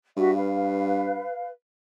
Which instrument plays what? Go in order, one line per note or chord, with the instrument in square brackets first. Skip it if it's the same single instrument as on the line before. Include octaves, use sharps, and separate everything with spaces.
[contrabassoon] G2 [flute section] F#4 E5
[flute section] B4 F5